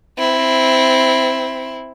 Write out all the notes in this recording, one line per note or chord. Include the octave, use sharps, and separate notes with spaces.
C4 E4